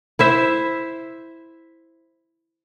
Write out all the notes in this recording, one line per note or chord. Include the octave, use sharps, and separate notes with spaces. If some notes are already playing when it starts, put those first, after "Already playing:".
E4 C5 E5